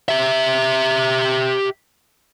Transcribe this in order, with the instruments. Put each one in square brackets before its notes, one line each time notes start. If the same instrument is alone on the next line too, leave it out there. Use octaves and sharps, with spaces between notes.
[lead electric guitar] G4 E5